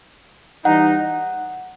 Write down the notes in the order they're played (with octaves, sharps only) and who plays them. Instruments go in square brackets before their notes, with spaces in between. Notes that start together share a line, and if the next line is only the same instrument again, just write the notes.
[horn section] E3 G3 D#4 [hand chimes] F#5